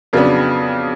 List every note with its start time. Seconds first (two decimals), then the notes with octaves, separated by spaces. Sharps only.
0.13 F2 C#3 F#3 B3 D4